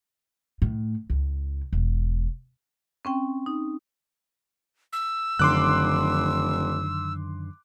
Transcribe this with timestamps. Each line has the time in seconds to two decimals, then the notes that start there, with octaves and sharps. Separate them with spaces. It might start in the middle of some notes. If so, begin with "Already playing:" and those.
0.62 A2
1.10 C#2
1.72 E1
3.05 C4 C#4 G5
3.46 D#4
4.93 E6
5.39 F1 F#2 D3 D#3 C6 D6 F#6